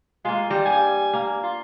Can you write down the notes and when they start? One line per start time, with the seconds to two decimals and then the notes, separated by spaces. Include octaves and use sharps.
0.25 G#3 A#3 F4
0.50 G3
0.66 G2 G#5
1.13 A#3
1.43 F4